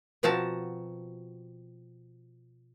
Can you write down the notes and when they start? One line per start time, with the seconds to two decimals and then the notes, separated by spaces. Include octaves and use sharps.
0.23 B2 F3 C4 F#4 A5 A#5